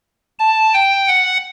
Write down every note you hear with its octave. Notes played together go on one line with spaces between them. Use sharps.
A5
G5
F#5